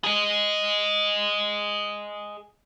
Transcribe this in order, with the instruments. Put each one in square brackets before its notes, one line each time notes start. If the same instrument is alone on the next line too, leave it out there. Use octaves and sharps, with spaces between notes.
[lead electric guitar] G#4 D#5